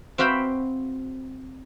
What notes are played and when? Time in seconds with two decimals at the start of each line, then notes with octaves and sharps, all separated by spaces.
0.18 C4 F#4 E5 F5 G5 B5